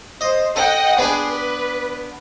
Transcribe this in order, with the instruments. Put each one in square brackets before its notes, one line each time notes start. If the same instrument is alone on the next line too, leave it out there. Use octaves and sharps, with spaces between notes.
[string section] C5 [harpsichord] D#5
[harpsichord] A4 [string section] D#5 F#5 G5
[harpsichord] B3 D4 [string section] G#4
[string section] B4